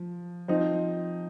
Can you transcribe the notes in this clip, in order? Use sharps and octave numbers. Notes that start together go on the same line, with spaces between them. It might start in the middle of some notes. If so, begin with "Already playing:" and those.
Already playing: F3
F3 C4 D#4